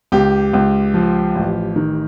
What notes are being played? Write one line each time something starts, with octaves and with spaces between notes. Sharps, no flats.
C#2 G4
C#2
F3
A1
D#3